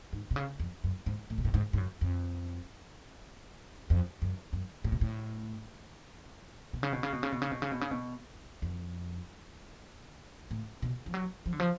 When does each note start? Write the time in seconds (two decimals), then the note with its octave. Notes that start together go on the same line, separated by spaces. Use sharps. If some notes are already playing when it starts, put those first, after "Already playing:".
0.13 G#2
0.31 B2
0.36 C#3
0.60 F2
0.84 F#2
1.06 G#2
1.30 A2
1.38 B2
1.45 A2
1.54 G#2
1.73 G#2
1.78 F#2
2.01 F2
3.90 F2
4.22 F#2
4.53 F#2
4.84 A2
4.92 B2
5.01 A2
6.73 B2
6.83 C#3
6.93 B2
7.03 C#3
7.13 B2
7.23 C#3
7.32 B2
7.42 C#3
7.51 B2
7.62 C#3
7.72 B2
7.81 C#3
7.91 B2
8.62 F2
10.51 A2
10.82 B2
11.06 F3
11.14 F#3
11.46 F3
11.53 D3
11.60 F3